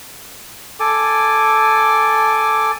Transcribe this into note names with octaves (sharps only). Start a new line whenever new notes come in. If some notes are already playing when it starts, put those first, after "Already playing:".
A4 G#5 D6